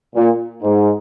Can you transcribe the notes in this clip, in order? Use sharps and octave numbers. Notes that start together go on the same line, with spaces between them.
A#2
G#2